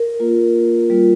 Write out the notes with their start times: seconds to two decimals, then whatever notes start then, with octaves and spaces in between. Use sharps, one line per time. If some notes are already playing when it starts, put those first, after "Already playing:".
Already playing: A#4
0.20 A#3 F4
0.90 G3 A#3 F4